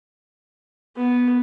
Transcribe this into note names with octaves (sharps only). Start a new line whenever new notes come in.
B3